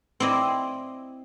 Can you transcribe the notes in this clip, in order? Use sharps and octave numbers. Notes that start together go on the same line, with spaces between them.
C4 E4 D5 D#5